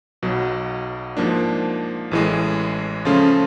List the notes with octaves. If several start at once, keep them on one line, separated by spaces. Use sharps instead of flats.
B1 B2 F#3
G#2 F3 A#3 D4
A1 A2 E3 G#3
C#3 F3 A3 C#4 F4